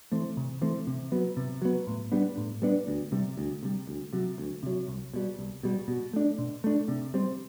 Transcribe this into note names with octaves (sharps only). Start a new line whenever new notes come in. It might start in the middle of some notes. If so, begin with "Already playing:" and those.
E3 A3 C4
C3
E3 A3 C4
C3
F#3 B3
C3
F#3 B3
A2
G3 B3 D4
A2
G3 B3 D4
D2
C3 G3
D2
C3 G3
D2
C3 F#3
D2
C3 F#3
C2
B2 G3
C2
B2 G3
B2
A3 D4
B2
A3 D4
C3
G3 C4